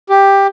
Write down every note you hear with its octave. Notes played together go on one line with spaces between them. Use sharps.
G4